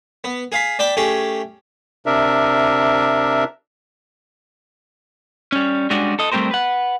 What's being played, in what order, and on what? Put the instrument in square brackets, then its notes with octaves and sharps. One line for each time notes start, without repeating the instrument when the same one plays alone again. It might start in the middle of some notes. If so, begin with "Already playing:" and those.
[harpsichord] B3
G#4 F5 B5
D5 G5 A5 B5 D6
A3 C#4 G4 G#4
[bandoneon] C3 D4 A#4 E5
[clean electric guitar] G3 C#4
G3 G#3 C#4 D4 F#4
A4 D#5
G3 A3 C4 G4 A#4 C5
B4 F#5